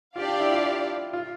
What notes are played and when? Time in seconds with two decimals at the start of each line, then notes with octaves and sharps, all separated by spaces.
0.15 D4 F4 G4 D5 F5
0.27 F4
0.40 E4
0.52 F4
1.13 F4